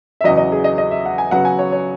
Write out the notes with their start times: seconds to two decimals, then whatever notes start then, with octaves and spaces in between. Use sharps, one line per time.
0.21 E5
0.24 E2 C#3 F#3 D#5
0.37 D#5
0.52 G#4
0.64 D#5
0.78 D#5
0.91 E5
1.06 F#5
1.18 G#5
1.31 C#3 F#3 B3 F#5
1.45 G#5
1.59 C#5
1.72 C#5